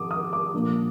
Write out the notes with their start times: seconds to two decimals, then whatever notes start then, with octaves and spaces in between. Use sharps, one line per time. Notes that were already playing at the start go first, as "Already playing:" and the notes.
Already playing: G#2 F3 C4 D6 D#6
0.11 D#6
0.33 D6
0.53 A#2 F3 A#3 D4